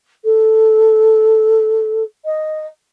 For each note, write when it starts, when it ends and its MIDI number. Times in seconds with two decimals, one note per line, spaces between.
0.25 2.03 69
2.25 2.66 75